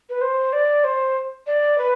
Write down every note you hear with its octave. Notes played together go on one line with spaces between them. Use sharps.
B4
C5
D5
C5
D5
B4